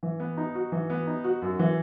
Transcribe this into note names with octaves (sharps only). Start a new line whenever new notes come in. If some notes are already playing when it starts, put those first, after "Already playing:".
E3
B3
D#4
F#4
E3
B3
D#4
F#4
F#2
E3